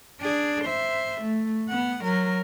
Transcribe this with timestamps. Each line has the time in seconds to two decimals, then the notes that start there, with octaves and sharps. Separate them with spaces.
0.21 D4 G#4
0.64 C5 E5
1.21 A3
1.68 B3 F#5
2.04 F#3 A#4